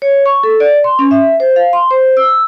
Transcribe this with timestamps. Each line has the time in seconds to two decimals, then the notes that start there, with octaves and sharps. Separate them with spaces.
0.02 C#5
0.26 C#6
0.44 A4
0.60 D5
0.84 C6
0.99 C#4
1.11 E5
1.40 C5
1.56 F5
1.73 C6
1.91 C5
2.17 E6